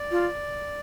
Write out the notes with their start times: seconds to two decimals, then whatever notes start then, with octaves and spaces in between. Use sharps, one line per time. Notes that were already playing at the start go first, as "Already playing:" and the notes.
Already playing: D5
0.11 F4